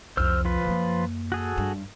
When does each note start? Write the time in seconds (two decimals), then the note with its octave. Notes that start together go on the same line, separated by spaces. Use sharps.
0.17 C2 F2 C5 E6 F6
0.45 F3 F4 B4
0.64 F#2 A#3
1.32 F#4 G#4 A4
1.58 G2